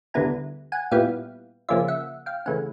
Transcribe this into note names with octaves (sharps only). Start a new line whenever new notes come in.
D2 D3 G3 B3 E4 G#5 A#5
F#5 G#5
A#2 G3 B3 E4 F5 G5
C#3 F3 A#3 C#4 F4 D5 E5
E5 F#5
F5 G5
C#3 E3 A3 C#4 F#5 G#5